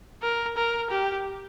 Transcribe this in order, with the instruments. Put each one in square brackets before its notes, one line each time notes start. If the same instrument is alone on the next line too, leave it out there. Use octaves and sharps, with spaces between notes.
[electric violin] A#4
A#4
G4